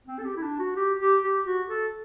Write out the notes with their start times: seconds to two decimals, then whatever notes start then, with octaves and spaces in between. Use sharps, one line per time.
0.07 C4
0.19 A4
0.25 G4
0.36 E4
0.43 D4
0.59 F#4
0.76 G4
1.00 G4
1.24 G4
1.46 F#4
1.69 A4